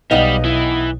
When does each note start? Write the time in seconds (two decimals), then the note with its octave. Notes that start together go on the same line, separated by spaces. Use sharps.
0.11 B1 G3 B3 D#4 G4 D#5 F5
0.44 E3